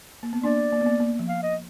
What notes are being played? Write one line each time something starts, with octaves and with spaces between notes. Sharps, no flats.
A#3
B3
A#3 D4 D5
A#3
B3
A#3
A#3
F3
F5
D#5